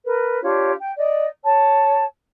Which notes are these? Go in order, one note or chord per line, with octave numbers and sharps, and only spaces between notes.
A#4 B4
D4 F4 G4 C#5
G5
D5 D#5
C#5 A5